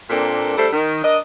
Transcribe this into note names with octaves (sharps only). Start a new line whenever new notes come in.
A#2 A#3 C4 D4 A4
G3 A3 D4 A4 C5
D#3
D4 A#4 D#5